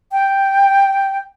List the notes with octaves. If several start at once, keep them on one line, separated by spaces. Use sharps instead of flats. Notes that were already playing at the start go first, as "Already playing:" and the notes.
G5